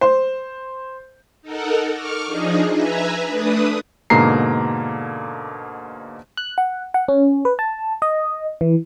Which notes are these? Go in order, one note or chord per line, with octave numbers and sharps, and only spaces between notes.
C5
D#4 A4 A#4 F#5
C#6 D6 F6
F3 D4 D#4 G#4 D#5
B4 E5 G#5 A#5
A3 D4 B4 D#6
G#2 B2 D3 A#3 A#5 C7
F#6
F#5
F#5
C#4
B4
A5
D#5
E3